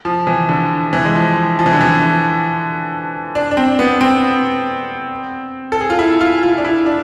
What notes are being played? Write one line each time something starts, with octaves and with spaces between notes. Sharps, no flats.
F3
E3
D3
E3
G#3
F3
F3
E3
D3
E3
D4
D4
C4
B3
C4
A4
G#4
F4
E4
F4
F4
D4
E4
D4